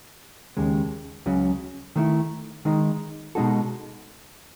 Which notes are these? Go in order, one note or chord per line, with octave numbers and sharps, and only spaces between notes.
D#2 C#3 G#3
C#2 C#3 F#3
D#3 A3 E4
D#3 G#3 D#4
B2 G#3 D#4 F#4 A4